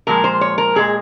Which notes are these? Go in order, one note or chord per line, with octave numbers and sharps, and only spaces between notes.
A#2 F3 G#3 A#4
C5
C#5
A#4
A#2 G#3 G#4